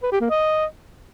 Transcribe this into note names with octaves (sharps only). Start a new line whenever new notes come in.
B4
G4
A#3
D#5